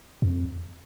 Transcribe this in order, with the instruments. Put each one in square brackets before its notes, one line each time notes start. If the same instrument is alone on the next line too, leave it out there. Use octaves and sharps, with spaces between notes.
[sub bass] F2